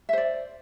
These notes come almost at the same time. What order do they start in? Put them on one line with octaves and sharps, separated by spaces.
E5 C5 D5